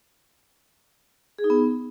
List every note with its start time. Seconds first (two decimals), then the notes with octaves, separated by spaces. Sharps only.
1.39 G#4
1.44 D#4
1.50 B3